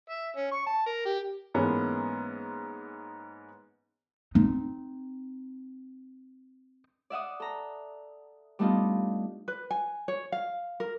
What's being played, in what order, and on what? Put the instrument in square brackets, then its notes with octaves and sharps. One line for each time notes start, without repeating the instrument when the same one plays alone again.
[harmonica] E5
C#4
C#6
A5
A#4
G4
[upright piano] G#2 E3 G#3 A#3 B3 C#4
[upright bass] C4 D#4
[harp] D5 E5 F#5 D#6
A4 A#5
G3 A3 B3 D4 D#4 F4
[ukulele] B4
G#5
C#5
F5
A#4